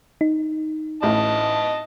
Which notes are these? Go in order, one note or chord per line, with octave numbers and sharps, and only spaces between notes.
D#4
A1 D#5 A5